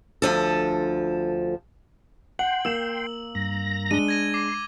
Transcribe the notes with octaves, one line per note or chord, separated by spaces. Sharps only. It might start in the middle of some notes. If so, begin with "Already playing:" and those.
D2 F3 A4
F#5 G5 C6 F#7
A#3 E6 E7
G2 A#5 A#6
G#3 D4 D#7 G7
G#6 A#6 D#7
C6 D6